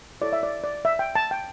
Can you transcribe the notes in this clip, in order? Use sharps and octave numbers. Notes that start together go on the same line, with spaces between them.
E4 A4 C#5 D5
E5
D5
D5
E5
G5
A5
G5